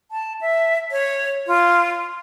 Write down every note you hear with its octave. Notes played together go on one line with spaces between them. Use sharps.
A5
E5
C#5
F4